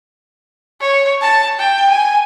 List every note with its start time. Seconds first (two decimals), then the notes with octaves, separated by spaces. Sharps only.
0.81 C#5
1.22 A5
1.60 G5
1.90 G#5